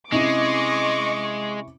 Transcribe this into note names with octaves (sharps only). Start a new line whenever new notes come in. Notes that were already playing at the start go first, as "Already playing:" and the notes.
C3 G#3 C#4 E4 D#5 C#6 D6